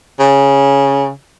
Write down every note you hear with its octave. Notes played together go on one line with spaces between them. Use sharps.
C#3